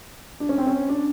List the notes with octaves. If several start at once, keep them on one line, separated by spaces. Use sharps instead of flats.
D4
C#4
C4
C#4
D4